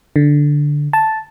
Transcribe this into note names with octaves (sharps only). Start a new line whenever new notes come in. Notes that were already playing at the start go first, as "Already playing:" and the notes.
D3
A5